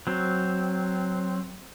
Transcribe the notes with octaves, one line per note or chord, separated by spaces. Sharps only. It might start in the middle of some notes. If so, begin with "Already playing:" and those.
F#3 C4